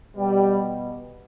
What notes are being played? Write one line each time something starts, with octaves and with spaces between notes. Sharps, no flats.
B2 G3